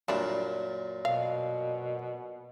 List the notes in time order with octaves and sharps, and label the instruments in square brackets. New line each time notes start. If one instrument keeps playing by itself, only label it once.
[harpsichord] F#2 A#2 [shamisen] G3 D4 E4
[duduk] B2 [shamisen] F5